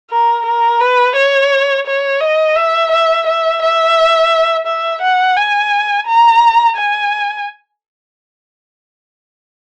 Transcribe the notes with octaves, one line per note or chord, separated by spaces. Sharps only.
A#4
A#4
B4
C#5
C#5
D#5
E5
E5
E5
E5
E5
F#5
G#5
A#5
G#5